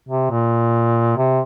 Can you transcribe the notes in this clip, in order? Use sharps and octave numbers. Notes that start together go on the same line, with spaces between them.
C3
A#2
C3